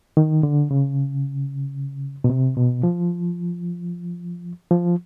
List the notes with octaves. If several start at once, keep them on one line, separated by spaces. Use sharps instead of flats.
D#3
D3
C#3
B2
C3
B2
F3
F3